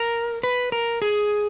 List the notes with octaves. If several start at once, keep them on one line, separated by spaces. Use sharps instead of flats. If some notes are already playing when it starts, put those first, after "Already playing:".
Already playing: A#4
B4
A#4
G#4